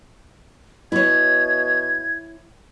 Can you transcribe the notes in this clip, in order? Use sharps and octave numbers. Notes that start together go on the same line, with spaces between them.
B2 E4 C#5 G#6